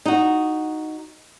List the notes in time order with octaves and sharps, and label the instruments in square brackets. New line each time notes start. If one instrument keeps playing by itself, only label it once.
[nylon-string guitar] D#4 F#4